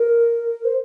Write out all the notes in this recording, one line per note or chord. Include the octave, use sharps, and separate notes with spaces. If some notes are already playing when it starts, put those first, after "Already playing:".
Already playing: A#4
C5